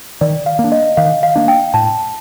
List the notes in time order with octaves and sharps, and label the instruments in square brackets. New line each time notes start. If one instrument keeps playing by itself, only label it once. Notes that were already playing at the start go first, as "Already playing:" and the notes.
[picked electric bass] D#3 [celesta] D5
[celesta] F5
[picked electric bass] A#3
D4
[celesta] D#5
[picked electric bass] D#3 [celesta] F5
[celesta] F5
[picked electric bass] A#3 D4
[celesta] G5
[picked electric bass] A2 [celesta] A5